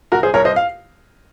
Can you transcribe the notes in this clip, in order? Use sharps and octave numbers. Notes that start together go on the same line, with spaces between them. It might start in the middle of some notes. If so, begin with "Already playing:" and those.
C2 F#4 A#4
G#4 C5
C2 A#4 C#5
C5 D#5
F5